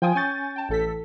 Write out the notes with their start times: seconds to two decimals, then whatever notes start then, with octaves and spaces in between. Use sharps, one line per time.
0.02 F3 F4 G5 G#5 D#6
0.15 C#4 G#5 C#6 G6 A6
0.56 G5 A5
0.69 A1 A4 B6